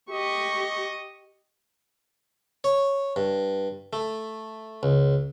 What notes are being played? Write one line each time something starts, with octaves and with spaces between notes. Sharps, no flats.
G4 D#5 C#6
C#5
G2
A3
C#2